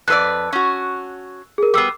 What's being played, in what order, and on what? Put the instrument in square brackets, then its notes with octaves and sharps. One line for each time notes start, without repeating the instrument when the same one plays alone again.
[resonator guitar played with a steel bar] F2 B4 D5 [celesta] E6 F#6
[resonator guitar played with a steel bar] C#4 F#4
[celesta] G#4 A#4
[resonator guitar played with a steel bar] G3 B3 [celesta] D6 E6 C7